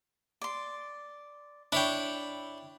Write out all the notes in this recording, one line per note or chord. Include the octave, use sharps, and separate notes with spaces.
D5 C6
D4 E4 C#5 G5